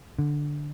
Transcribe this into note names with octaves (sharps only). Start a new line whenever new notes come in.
D3